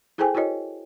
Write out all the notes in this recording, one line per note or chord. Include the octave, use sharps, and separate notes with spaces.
E4 G#4 A4 C5 G5 G#5
E4 F#4 A#4 C#5 D#5